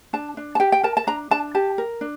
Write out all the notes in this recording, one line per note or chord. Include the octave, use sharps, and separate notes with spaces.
D4 A5
D4
A5
G4 G5
G5
A#4 A5
A5
D4 A#5
D4 A5
G4 A5
A#4
D4